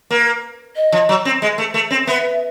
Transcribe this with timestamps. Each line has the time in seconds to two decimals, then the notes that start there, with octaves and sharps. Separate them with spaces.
0.10 A#3
0.76 D#5
0.92 F3
1.09 F#3
1.25 C4
1.42 G#3
1.58 A3
1.74 A3
1.91 C4
2.07 B3 E5